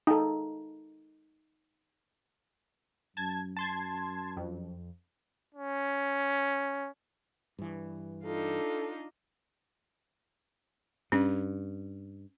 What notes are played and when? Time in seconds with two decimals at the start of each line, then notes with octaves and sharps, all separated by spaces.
0.07 D#4 A4
3.17 F#2 A5 G#6
3.57 A5 C6 G#6
4.37 F2
5.55 C#4
7.59 G2 E3
8.25 D4 D#4 F4 A4
11.12 G2 C#4